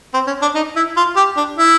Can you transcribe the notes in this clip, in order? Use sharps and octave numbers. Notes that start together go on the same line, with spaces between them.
C4
C#4
D4
D#4
E4
F4
G4
D4
E4